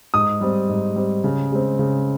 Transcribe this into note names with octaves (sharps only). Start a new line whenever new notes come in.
G#2 D#6
G3 C4
G#2
G3 C4
C#3
G#3 C4
C#3